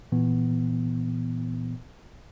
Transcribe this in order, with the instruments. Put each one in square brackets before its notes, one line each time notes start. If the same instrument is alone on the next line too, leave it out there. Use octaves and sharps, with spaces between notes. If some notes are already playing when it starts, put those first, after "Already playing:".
[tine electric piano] A#2 E3 B3